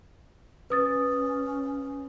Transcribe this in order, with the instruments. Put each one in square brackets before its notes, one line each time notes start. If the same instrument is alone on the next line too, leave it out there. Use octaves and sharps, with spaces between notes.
[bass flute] C#4 [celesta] B4 D#6 A6